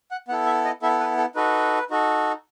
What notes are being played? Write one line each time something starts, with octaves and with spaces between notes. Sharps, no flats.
F#5
B3 E4 A4 F#5
E5
D#5
B3 E4 A4 E5
B4
A4
D#4 F#4 A4 B4
D#4 F#4 A4